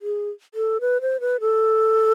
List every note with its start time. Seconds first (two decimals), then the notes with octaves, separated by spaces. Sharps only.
0.02 G#4
0.54 A4
0.81 B4
1.01 C5
1.21 B4
1.40 A4